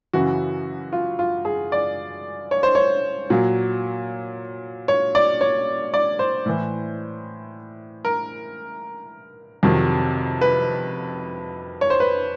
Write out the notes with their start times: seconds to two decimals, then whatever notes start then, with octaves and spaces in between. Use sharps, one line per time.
0.13 F#2 C#3 E3 F#4
0.93 F4
1.19 F4
1.45 G#4
1.72 D5
2.51 C#5
2.63 C5
2.75 C#5
3.30 A#2 F#3
4.88 C#5
5.15 D5
5.41 C#5
5.94 D5
6.19 C5
6.46 A2 E3
8.05 A#4
9.63 F2 C3 D#3 F#3
10.41 B4
11.81 C#5
11.90 C5
12.00 B4